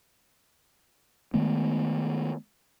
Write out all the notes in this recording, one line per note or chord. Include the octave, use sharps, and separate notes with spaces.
D#3 G#3 A3 B3